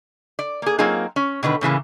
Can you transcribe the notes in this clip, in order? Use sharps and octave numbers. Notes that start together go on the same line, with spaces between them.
D5
A#3 G#4
F#3 A#3 C4 D#4 F4 G#4
C#4
B2 D3 D#3 B4
A2 C#3 E3 A#3